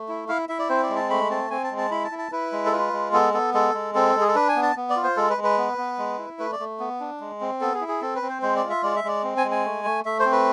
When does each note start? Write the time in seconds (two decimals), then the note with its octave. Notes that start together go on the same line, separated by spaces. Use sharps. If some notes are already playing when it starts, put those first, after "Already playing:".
Already playing: A3
0.09 E4
0.28 E4 F5
0.49 E4 E5
0.59 D5
0.69 C4 C5
0.83 D5
0.89 G#3
0.96 A5
1.10 A3 B5
1.30 C4 A5
1.50 C4 G#5
1.64 A5
1.71 G#3
1.78 A5
1.91 E4 B5
2.04 A5
2.11 E4
2.19 A5
2.32 E4 B4
2.52 G#3
2.66 A4
2.72 F4 B4
2.93 G#3
3.13 B3 A4
3.34 B3 A4
3.54 G#3 A4
3.74 G#3
3.95 C4 A4
4.15 G#3
4.21 G#4
4.28 A4
4.35 D4 B4
4.48 G#5
4.56 B3
4.63 A5
4.76 B3
4.90 D5
4.96 F4
5.04 C5
5.17 G#3 A4
5.30 B4
5.37 G#3
5.44 B4
5.58 B3
5.78 B3
5.98 G#3
6.19 E4
6.39 A3 B4
6.52 D5
6.59 A3
6.80 B3
7.00 D4
7.20 G#3
7.41 C4
7.61 B3 A4
7.74 G#4
7.81 E4
7.88 G#4
8.02 C4 A4
8.15 B4
8.22 C4
8.29 C5
8.42 G#3 C5
8.56 D5
8.63 F4
8.70 E5
8.83 G#3 D5
8.96 E5
9.04 G#3 D5
9.24 C4
9.37 G#5
9.44 G#3
9.51 G#5
9.65 A3
9.85 A3
10.05 A3 E5
10.19 C5
10.26 C4
10.32 B4